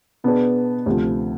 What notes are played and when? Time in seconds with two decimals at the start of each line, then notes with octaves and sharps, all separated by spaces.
0.24 B2 B3 D4 G#4 B4
0.86 D2 C3 F3